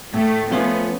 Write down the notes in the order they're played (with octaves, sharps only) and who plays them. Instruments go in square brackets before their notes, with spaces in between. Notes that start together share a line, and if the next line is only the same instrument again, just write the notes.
[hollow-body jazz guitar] A2 [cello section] A3
[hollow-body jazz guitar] F3 A3 C#4 F4 [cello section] B3